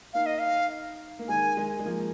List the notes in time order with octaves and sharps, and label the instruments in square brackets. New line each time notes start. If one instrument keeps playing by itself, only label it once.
[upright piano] A#3 D#4 [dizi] F5
[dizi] D#5
F5
[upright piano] A#3
[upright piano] D#3 G#3 [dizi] G#5
[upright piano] D#3 G#3
G#3
F3 A#3